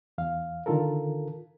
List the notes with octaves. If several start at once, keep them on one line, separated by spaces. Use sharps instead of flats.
E2 F5
D3 D#3 F4 A4 A#4